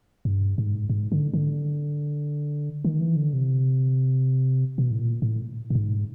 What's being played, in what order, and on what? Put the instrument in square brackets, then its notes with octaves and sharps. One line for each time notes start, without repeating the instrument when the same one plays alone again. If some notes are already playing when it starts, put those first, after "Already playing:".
[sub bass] G2
G#2
G#2
D3
D3
D#3
E3
D3
C3
B2
A2
A#2
A2
A2
G#2